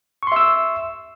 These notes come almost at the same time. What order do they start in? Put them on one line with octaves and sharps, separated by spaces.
C#6 C6 E5 E6